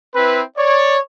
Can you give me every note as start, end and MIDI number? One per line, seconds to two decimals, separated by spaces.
0.15 0.41 60
0.15 0.41 64
0.15 0.41 71
0.57 0.97 73
0.57 0.97 74